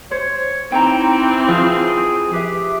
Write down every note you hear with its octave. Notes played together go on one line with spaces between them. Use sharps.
C5 C#5
E3 C4 D#4 G5 A#5
F3 G#4
G4 B4 E5